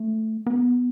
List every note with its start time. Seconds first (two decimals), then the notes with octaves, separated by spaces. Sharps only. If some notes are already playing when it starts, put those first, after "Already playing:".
Already playing: A3
0.47 B3